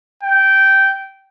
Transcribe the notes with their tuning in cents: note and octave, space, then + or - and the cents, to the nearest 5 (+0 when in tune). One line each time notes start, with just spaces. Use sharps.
G5 -15